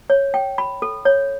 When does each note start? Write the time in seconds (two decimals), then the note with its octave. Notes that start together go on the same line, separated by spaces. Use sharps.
0.10 C#5
0.34 G5
0.58 B5
0.82 A4
1.05 C#5